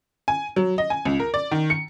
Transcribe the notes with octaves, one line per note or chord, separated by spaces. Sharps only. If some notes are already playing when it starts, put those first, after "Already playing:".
G#5
F#3
D#5
G#5
C#2
A#4
D5
D#3
C#7